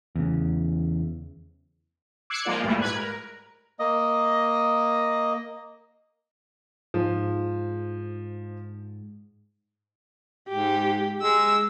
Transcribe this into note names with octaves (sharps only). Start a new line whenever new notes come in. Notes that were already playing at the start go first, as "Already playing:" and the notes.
E2 C#3
D6 E6 F#6 G#6 C7 C#7
F3 G#3 A#3 F4 D5
G1 D2 A#2 G3 A3 E4
G#2 B4 F#6 G#6
A#4
A#3 D#5
G#2 F3
G#2 G4
G#3 E6